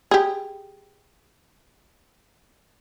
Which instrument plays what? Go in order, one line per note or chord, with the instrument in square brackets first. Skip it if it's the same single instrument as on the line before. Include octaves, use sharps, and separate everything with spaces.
[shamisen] G4 G#4